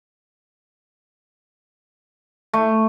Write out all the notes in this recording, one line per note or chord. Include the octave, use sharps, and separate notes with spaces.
A3